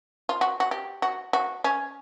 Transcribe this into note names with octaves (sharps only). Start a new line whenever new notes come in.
F4
F#4
F#4
G4
F#4
F#4
C#4